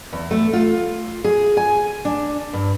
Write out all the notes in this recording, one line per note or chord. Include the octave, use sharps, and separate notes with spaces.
E2
A3
F4
G#4
G#5
D4
G2